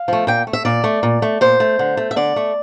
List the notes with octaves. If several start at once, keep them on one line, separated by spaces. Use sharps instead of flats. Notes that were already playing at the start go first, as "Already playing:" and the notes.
Already playing: F5
F3 A3
A#2 G5
A3
E5
A#2 D5
A3
A#2
A3
A#2 C5
A3
D3
A3
E5
D3 D5
A3